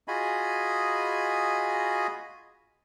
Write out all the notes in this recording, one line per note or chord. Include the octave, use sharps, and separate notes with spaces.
F4 F#4 G#4 D#5 G#5 B5